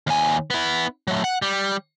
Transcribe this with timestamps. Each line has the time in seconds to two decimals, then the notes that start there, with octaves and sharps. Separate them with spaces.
0.07 D#2 G#5
0.50 B3 E4
1.08 F#3 A3
1.24 F#5
1.42 G3